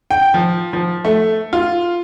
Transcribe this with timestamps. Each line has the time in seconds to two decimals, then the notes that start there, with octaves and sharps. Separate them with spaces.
0.11 G5
0.34 F3
0.73 F3
1.05 A3
1.53 F4